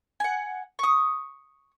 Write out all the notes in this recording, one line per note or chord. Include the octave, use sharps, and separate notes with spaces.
F#5 G#5
C#6 D#6